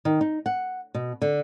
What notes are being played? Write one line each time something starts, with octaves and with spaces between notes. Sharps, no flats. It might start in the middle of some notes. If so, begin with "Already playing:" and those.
D#3
D#4
F#5
B2
D3